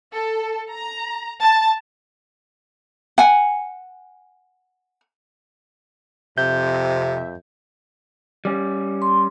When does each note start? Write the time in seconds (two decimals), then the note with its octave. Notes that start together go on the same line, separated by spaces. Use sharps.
0.13 A4
0.70 A#5
1.41 A5
3.18 F#5 G#5
6.38 F2 C3 E5 G6
8.45 G3 C#4
9.02 C6